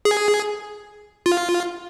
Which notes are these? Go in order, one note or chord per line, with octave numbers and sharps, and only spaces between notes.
G#4
F4